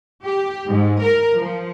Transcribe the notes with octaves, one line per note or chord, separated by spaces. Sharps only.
G4
G#2
A#4
F3